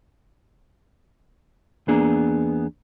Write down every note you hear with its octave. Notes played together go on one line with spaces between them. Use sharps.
E2 A#3 B3 D4 G#4